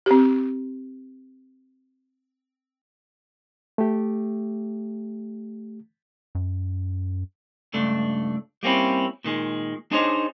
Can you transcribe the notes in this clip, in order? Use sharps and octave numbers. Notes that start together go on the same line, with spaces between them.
C4 G4
A3 G4
F#2
C#2 G2 A3 D4
G3 A#3 C4 C#4 E4
A#2 D#3 G#3
D4 D#4 G#4 C5 C#5 D#5